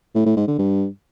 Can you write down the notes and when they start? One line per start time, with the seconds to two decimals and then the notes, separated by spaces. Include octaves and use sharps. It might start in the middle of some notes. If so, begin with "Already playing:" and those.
0.15 A2
0.26 A2
0.37 G#2
0.48 D3
0.58 G2